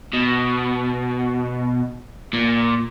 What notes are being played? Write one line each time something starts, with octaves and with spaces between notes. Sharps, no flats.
B2
A#2